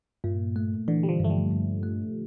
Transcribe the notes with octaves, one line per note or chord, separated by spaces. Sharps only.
G2 A#2
A3
D3 E3
G3
F3
G2 A3
G3
G2
A3